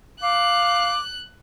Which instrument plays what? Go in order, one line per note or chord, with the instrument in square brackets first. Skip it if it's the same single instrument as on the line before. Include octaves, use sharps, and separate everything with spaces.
[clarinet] F5 [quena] D6 [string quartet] F#6